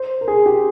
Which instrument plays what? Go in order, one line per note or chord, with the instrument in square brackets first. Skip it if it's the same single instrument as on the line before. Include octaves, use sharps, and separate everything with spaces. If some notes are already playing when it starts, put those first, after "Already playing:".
Already playing: [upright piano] C5
A#4
G#4
G4